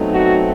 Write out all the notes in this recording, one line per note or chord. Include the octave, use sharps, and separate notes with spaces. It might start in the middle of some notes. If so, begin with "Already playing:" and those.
Already playing: B2 F#3 A3 C4 D#4
F#4